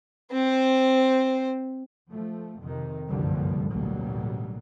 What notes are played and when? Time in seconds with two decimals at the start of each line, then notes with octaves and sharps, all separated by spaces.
0.32 C4 C5
2.11 F3 A3
2.61 F2 C3 D#3
3.10 F#1 C2 G2 D3 F3 G3
3.71 A1 D2 B2 F#3 G3 A#3